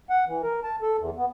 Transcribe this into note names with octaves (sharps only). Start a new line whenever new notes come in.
F#5
E3
A#4
A5
A4
E2
B3